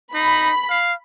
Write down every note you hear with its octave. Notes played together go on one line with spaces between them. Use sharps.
D#4 B5
F5